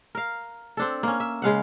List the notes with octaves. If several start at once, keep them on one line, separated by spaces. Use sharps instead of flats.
A#4 F5
C4 D4 A4
A#3 C#4
E5
C#3 G#3 F5 F#5